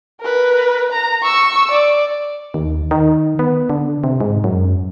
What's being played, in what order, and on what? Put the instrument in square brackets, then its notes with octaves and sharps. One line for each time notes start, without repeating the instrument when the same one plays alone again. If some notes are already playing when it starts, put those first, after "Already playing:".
[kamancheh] A#4 B4
A#5
C#6 E6
D5
[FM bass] D#2
D#3
B3
D3
C3
G#2
F#2